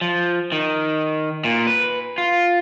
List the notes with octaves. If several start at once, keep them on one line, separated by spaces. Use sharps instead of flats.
F3
D#3
A#2
B4
F4